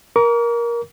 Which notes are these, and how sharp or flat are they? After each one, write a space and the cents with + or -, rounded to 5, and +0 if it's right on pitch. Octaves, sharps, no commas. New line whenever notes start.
A#4 +15 D6 -45